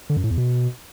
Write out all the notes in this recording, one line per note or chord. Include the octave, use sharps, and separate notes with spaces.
D3
F#2
A2
E2
B2